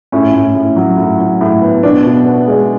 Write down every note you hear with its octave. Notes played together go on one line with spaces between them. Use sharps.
A2 C#4
A2
A2
F#3
A2
F#3
A2
B3
B2 D4
B2
B3
G#3